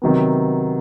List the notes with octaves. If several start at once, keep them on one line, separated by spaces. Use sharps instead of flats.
C3 D#3 F#3 B3